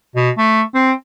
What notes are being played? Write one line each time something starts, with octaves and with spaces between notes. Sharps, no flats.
B2
A3
C4